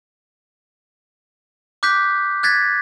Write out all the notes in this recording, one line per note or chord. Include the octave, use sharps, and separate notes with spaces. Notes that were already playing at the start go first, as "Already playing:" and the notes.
D6 F#6 G6 B6
F#6 G#6 A6 B6